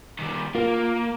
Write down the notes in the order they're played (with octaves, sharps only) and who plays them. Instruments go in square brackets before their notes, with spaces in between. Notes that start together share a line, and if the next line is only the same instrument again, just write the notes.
[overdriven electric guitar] D#3 G3
[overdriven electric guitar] A#3 [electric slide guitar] F4 A#4